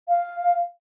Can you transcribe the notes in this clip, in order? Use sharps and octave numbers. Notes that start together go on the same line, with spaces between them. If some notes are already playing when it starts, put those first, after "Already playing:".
F5